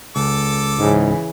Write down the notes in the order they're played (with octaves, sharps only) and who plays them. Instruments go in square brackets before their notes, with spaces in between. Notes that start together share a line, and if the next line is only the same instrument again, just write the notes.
[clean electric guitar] C#2 [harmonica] A4 D6
[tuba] G#2 [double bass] C#3 E3